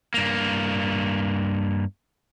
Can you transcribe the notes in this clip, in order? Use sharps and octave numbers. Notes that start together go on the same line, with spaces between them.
G2 A#3